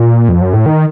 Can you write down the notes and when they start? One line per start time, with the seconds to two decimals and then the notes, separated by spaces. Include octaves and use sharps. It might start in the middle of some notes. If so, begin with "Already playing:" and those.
Already playing: A#2
0.29 F2
0.41 F#2
0.53 A2
0.66 D#3